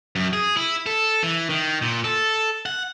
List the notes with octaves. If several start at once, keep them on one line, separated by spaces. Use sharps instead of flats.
F#2
G#4
E4
A4
E3
D#3
A#2
A4
F#5